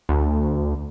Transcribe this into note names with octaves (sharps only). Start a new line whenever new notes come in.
D2